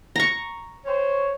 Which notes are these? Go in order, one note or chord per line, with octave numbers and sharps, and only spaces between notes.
A#5 C#6
C5 C#5